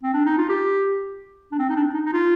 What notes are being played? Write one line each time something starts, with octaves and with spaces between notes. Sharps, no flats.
C4
D4
D#4
F4
G4
D4
C4
D#4
D4
D#4
D#4
F4